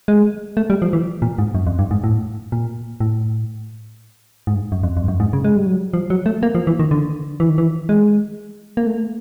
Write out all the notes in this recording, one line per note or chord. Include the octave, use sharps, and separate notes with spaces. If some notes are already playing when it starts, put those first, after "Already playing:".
G#3
A3
G3
F3
E3
A#2
G#2
F#2
F2
G2
G#2
A2
A#2
A2
G#2
G2
G#2
F#2
F2
F2
G2
F#2
G#2
C#3
G#3
G3
F#3
G3
F3
F#3
A3
A#3
F3
E3
D#3
D3
E3
D#3
E3
G#3
A#3
A3